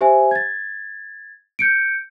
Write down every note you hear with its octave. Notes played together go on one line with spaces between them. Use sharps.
G4 C5 E5 G#5
G#6 A6
G6 C#7 D7